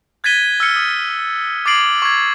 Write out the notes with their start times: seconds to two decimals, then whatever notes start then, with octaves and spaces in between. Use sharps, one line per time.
0.24 F#6 G#6 A6 B6 D#7 G7
0.60 E6 F6 C#7 G7
0.76 D#6
1.66 D6 G#6 A6 C7 D7 F#7
2.02 C#6 G#6